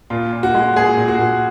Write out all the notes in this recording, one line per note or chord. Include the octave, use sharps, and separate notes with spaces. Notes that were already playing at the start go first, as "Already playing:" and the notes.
A#2 F4
A#2
F#4
G#3
A#2 G#4
A#2
F#4
A#2